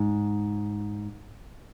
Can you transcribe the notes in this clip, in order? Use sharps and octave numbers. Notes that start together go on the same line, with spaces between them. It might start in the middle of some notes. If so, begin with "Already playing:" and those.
Already playing: G#2